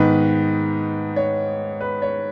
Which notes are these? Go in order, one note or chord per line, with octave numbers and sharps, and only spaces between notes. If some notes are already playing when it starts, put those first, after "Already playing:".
Already playing: G#2 D#3 B3 D#4 B4
C#5
B4
C#5